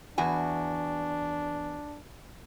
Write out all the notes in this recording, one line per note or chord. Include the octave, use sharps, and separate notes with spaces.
E2 D4 F#4 G#5